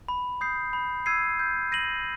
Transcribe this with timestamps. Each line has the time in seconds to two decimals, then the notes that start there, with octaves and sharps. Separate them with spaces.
0.08 B5
0.41 D#6 G6 C7
0.73 B5
1.06 E6 G#6 C7 D#7
1.39 G6
1.72 A#6 D#7 F#7